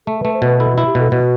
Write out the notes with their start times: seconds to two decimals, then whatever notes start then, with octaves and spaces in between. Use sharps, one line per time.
0.07 A3 A4
0.21 A3 B4
0.33 C5
0.42 B2 B4
0.59 E4 A4
0.73 E4 F#4
0.86 G4
0.95 B2 A4
1.12 B2 F#4